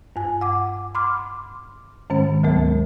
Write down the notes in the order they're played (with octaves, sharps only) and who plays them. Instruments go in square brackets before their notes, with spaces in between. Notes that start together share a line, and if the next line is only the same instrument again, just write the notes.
[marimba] G2 G#5
F#5 D6
B5 C6 D6 F6
G#2 D#3 G#3 C#4
D2 F#3 G#3 B3 A#4